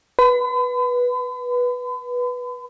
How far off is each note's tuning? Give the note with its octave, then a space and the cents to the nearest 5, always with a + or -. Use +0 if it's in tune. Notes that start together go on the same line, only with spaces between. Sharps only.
B4 -10 B5 +45